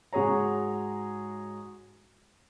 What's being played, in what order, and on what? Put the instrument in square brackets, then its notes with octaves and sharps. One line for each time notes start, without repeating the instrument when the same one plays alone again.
[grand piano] G#2 G#3 F#4 G#4 C#5 A#5